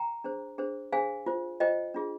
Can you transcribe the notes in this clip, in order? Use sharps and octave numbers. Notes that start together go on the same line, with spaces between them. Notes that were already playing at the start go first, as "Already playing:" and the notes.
Already playing: G5 A#5
D4 G#4 C5
D4 G#4 C5
D4 G#4 C5 F5 G#5
F4 C5
F4 C5 D#5 G5
D4 F4 G#4